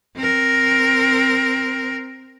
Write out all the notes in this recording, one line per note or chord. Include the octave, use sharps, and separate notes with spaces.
C4 A#4